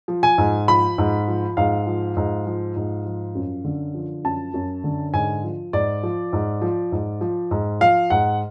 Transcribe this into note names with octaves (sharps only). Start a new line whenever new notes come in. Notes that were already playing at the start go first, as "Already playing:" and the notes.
F3
G#5
G#2
F3 B5
G#2
F3
G#2 F5
F3
G#2
F3
G#2
F3
F#2
D3
F3
F#2 A5
F#2
D3
G#2 G#5
F3
G#2 D5
F3
G#2
F3
G#2
F3
G#2
F3 F5
G#2 F#5